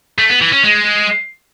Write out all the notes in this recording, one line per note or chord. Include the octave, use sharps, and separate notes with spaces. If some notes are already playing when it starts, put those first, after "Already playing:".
A3
B3
E3
C#4
G#3